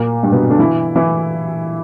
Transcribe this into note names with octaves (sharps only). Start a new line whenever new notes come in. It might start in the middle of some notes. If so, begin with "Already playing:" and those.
Already playing: A#2 A#3
G2 G3
B2 B3
D3 D4
E3 E4
E3 E4